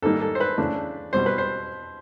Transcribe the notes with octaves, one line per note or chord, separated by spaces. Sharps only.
G#2 D#3 G3 A#3 D#4 A4
A4
C5
B4
C#3 E3 A3 D4
B2 G3 C4 C5
B4
C5